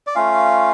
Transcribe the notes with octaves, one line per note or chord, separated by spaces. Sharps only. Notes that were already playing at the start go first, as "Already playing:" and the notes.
D5
A3 C#4 F4 F5